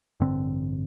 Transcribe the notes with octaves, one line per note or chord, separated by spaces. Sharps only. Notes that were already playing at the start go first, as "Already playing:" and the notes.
A1 G2 D3 C4